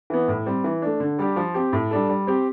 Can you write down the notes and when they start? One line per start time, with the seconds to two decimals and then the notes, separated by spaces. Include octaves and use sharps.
0.10 E3 B3
0.28 A2
0.46 G3 C4
0.64 E3
0.82 A3 D4
1.00 D3
1.18 G3 D4 G4
1.36 F3
1.54 C4 G4
1.73 A2
1.91 G3 D4 A4
2.09 G3
2.27 C4 G4